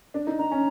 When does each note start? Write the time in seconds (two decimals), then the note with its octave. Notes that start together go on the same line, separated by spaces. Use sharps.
0.14 D4
0.27 D#4
0.39 D4 A#5
0.51 C#4